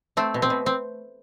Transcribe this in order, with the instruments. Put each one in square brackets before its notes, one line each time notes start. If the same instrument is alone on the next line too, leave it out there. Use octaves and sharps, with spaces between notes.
[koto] A3 C4
B2
C4
B2
C4